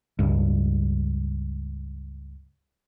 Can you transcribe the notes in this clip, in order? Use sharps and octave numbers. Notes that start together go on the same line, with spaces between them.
C#2 G2